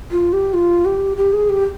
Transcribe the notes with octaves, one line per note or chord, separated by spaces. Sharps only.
F4
G4
F4
G4
G4
G#4
G4